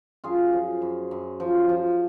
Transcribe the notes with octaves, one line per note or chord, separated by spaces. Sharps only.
F#2 F4 G#4
F3
F#2
F#2
F3
F3